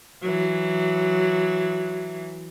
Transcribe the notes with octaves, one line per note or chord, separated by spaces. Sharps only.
E3 F#3